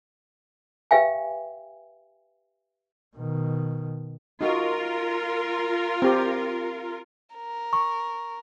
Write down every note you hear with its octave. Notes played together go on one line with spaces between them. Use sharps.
G4 B4 E5 F5 G5 G#5
B2 D#3
D#4 F4 F#4 A#4
C4 G4
A#4
C#6